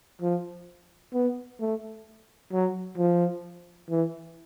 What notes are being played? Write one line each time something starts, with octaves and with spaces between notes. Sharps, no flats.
F3
B3
A3
F#3
F3
E3